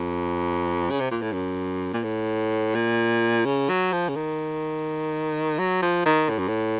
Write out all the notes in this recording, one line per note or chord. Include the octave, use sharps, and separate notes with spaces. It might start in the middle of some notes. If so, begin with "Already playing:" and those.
Already playing: F2
C#3
C3
A#2
A2
F#2
A#2
A2
A#2
C#3
F#3
F3
C#3
D#3
F#3
F3
D#3
A2
F#2
A2